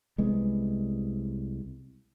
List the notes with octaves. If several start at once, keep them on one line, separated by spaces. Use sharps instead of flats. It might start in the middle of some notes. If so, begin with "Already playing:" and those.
C2 G#3 B3